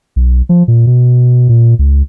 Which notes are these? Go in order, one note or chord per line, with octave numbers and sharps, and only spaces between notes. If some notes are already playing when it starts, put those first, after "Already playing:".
B1
F3
A#2
B2
A#2
C#2